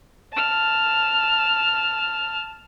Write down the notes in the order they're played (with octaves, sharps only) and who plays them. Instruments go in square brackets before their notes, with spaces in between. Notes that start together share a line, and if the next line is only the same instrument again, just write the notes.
[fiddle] A5 F6